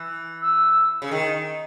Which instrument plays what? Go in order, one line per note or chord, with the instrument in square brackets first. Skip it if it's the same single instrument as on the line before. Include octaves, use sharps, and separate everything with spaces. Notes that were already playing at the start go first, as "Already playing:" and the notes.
Already playing: [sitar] E3
[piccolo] E6
[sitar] C#3
D#3